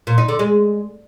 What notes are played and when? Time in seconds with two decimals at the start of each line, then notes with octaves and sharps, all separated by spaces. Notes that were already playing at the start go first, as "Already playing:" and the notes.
0.07 A#2
0.18 D#4
0.28 D3
0.39 G#3